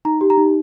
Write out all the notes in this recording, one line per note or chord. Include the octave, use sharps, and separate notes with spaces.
D#4 A#5
G4
A#5
D#4